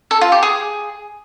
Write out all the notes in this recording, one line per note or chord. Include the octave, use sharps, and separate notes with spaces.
A4
F4
G4
G#4